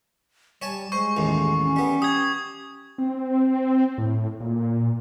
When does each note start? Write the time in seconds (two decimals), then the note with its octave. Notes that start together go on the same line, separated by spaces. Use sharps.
0.62 G3 C#5 G#5 A5
0.92 G#3 C5 C#6
1.17 A1 D#2 A2
1.63 C#4
1.76 G3 B3
2.02 G4 D#6 G#6
2.98 C4
3.98 A2
4.40 A#2